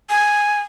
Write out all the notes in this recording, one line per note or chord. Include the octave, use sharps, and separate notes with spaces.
G#5